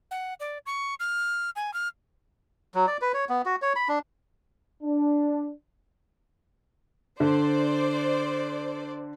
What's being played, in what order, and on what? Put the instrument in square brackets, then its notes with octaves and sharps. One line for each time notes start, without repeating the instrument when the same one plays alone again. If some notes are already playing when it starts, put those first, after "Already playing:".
[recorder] F#5
D5
C#6
F6
G#5
F6
[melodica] F#3
D5
B4
C#5
B3
F#4
C#5
B5
D4
[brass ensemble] D4
[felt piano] D3 [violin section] C5 D5